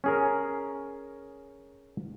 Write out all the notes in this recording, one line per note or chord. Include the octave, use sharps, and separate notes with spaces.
C#4 G#4 A#4